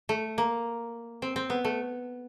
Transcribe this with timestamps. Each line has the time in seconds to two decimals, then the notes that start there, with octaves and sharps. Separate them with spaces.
0.09 A3
0.38 A#3
1.22 C4
1.36 C4
1.50 B3
1.65 A3